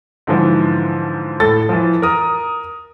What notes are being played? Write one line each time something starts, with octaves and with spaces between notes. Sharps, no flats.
G#2 D3 E3 F3
A2 A4 A6
E3 F3
A#4 D#6